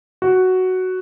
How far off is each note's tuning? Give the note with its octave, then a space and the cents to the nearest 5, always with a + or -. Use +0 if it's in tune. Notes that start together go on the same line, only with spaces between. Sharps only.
F#4 +5